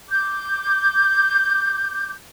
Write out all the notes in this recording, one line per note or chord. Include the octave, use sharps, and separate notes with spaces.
D6 G6